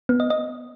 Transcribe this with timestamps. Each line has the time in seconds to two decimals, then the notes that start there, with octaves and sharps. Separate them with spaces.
0.09 B3
0.20 D#5
0.30 D#5